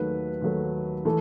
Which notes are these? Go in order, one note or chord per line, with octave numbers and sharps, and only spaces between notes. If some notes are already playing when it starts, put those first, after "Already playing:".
Already playing: D#2 D#3 F#3 A3 B4
D#2 D#3 F#3 A3
E3 A3 A4